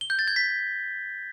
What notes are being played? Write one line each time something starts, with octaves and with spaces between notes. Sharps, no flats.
G7
G6
A6
G#6
B6